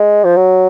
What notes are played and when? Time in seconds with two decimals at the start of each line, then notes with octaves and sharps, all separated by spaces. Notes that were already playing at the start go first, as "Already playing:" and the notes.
Already playing: G#3
0.24 F3
0.36 F#3